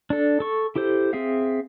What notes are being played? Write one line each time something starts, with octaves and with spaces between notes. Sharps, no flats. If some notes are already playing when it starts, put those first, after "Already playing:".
D4 A4
A4 C#6
E4 G4 A4 C5
C4 G#4 E5 F5